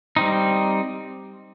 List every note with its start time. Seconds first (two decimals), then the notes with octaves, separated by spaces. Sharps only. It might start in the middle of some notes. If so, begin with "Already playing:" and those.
0.16 G3 C4 D#4